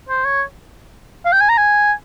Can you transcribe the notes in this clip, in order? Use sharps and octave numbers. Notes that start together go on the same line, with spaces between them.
C5
C#5
F5
G5
G#5
A#5
G#5